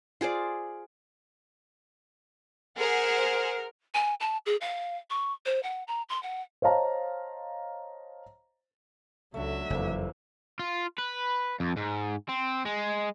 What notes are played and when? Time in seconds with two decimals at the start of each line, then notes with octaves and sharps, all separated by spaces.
0.21 F4 G#4 C5 D5
2.77 G#4 A#4 C5 F#5
3.94 G#5
4.20 A5
4.46 G#4
4.61 F5
5.10 C#6
5.46 C5
5.63 F#5
5.88 A#5
6.09 C6
6.23 F#5
6.62 C5 C#5 D#5 F5 A5 A#5
9.34 C#2 D3 F#3 A3 E5
9.70 F#1 F2 C3 E3 A#3
10.59 F4
10.99 B4
11.60 F2
11.77 G#2
12.29 C4
12.65 G#3